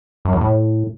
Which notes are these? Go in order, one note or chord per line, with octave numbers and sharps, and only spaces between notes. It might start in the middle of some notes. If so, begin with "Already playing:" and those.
F#2
E2
A2